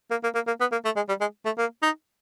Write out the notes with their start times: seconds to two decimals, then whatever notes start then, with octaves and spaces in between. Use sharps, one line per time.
0.11 A#3
0.24 A#3
0.35 A#3
0.47 A#3
0.60 B3
0.72 A#3
0.85 A3
0.96 G#3
1.09 G3
1.21 G#3
1.46 A3
1.58 A#3
1.82 D#4